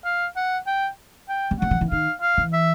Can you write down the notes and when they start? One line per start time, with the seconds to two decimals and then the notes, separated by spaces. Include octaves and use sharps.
0.05 F5
0.36 F#5
0.67 G5
1.29 G5
1.51 G3
1.60 F#3 F#5
1.71 F3
1.81 E3
1.91 D#3 F5
2.21 F5
2.37 E3
2.53 E5